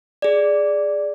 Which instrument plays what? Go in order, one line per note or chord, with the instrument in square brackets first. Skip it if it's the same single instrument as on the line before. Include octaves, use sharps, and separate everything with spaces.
[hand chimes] G#4 D5